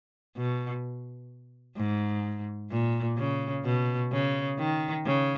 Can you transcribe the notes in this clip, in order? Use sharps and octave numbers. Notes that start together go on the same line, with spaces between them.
B2
G#2
A#2
C#3
B2
C#3
D#3
C#3